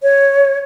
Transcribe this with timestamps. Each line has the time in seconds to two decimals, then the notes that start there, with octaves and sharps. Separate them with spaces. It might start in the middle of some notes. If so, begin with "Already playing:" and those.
0.03 C#5